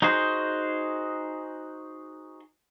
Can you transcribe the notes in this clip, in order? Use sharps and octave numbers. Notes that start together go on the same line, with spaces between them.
D#4 F#4 G#4 C5